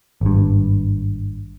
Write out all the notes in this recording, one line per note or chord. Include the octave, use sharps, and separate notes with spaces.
G#1 G2